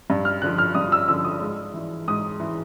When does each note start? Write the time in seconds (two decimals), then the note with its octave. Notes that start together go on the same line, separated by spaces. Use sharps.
0.10 G2
0.25 F6
0.42 D3 F3 F#6
0.58 F6
0.75 G2 D#6
0.92 E6
1.08 D3 F3 E6
1.24 D#6
1.41 G#2
1.74 E3
2.08 G#2 D#6
2.40 E3